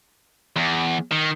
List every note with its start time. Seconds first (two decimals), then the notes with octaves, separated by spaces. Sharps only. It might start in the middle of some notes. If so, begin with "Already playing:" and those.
0.57 E2
1.12 D#3